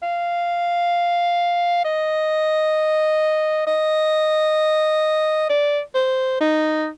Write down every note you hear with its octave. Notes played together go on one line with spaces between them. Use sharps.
F5
D#5
D#5
D5
C5
D#4